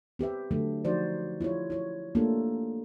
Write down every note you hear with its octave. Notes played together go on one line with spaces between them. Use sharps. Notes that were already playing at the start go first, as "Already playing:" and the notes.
C4 G4 B4 E5
D3 F#3 A3
F3 F#3 D#4 F#4 C5 D5
E4 F4 G4 C#5
E4 C#5
A3 A#3 D4 F4 G4 A4